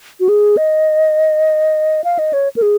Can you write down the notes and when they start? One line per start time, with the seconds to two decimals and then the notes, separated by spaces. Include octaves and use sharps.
0.20 F#4
0.29 G#4
0.57 D#5
2.04 F5
2.19 D#5
2.33 C#5
2.56 A#4
2.62 G#4